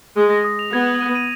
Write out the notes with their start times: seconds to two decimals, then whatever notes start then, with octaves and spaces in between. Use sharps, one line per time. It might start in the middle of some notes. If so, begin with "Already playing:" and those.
0.17 G#3 D#6
0.30 A#6
0.44 D#6
0.59 F7
0.73 B3 G#6
0.87 F#7
1.01 D#7
1.15 D#7